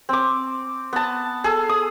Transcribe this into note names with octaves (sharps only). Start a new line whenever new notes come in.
C4 D6
B3 A5
G#4 A4
D#6